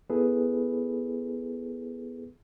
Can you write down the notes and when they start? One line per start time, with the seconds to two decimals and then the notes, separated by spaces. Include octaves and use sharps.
0.10 B3 E4 G#4 A4 B4